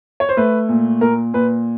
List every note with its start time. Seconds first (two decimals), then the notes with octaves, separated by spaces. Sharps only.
0.20 C#5
0.29 C5
0.37 A3 B4
0.69 A#2
1.01 A#2 A#4
1.34 A#2 B4